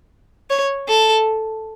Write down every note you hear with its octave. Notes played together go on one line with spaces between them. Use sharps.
C#5
A4